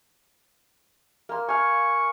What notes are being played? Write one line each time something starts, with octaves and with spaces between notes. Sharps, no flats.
A#3 C6
F5 G#5 C#6